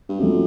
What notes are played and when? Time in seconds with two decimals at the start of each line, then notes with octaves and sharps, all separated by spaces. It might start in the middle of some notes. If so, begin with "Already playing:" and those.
0.09 G2
0.19 F#2 F3 A3 C4